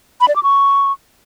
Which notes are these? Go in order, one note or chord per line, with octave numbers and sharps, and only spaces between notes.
B5
D5
D6
C#6